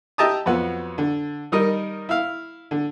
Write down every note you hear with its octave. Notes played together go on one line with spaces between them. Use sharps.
G4 D#5 E5 A5 A#5 D#6
F2 F#3 B3 F#4
D3
D#3 G3 D#4 A#4 D#5
E4 F5
D3